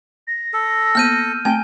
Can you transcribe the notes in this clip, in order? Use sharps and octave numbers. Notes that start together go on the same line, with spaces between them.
A#6
A4
A#3 B3 F6 G6 D#7
A3 C4 G5 G#5